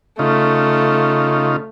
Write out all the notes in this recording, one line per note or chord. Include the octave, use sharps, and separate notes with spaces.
C#3 A3 D#4 F4